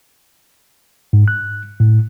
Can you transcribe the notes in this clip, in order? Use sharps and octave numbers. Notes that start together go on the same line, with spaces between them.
G#2
F#6
A2